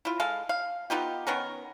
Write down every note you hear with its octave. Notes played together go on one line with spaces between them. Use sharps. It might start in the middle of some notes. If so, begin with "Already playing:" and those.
E4 F4
G#3 A4 F5
F5
B3 D#4 F4 G4
D#3 B3 C#4 A#4